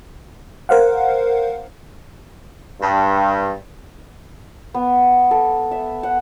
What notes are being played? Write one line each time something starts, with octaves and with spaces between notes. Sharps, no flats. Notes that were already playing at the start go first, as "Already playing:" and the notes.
A#4 C5 F5 F#5
G2
B3
A4
E5
F#5